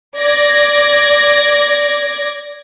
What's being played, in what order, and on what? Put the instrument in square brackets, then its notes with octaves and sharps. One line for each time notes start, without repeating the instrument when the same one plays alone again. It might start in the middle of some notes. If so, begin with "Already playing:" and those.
[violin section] D5 G#6 A#6